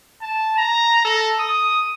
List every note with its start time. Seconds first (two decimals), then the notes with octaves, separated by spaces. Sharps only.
0.22 A5
0.57 A#5
1.05 A4
1.40 D#6